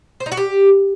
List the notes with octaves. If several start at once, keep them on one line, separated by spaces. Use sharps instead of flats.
C5
D#4
F#4
G4